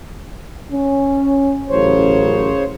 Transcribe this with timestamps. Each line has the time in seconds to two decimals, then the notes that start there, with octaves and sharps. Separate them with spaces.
0.71 C#4
1.70 A1 C#3 F#3 A#4 C5 C#5